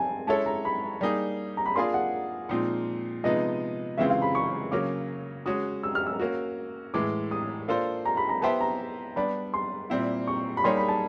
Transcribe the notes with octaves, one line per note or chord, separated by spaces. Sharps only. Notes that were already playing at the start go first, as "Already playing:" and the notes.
Already playing: C4 G#5 A5
G#3 C#4 E4 A4 C#5 A5
A#5
B5
G3 A#3 D#4 G#4
A#5
B5
A#3 D4 F4 G#4 C6
F#5
A#2 F3 G#3 C4 D#4
C3 F3 G#3 B3 D#4 D#5
C#3 E3 G#3 C4 F4 E5
F5
B5
C#6
C#3 F#3 A#3 C#4 D6
G#3 C#4 F#4 D#6
E6
F6
E6
A#3 C#4 F#4
A2 E3 G#3 D6
D#6
A#3 D4 F4 A4 C5
A#5
B5
A#5
B3 E4 G4 C5 E5 A5
A#5
G3 B3 D4 B5
C6
A#2 G3 C4 E4
C#6
B5
G3 A#3 D#4 G#4 C#5 C6
B5
A5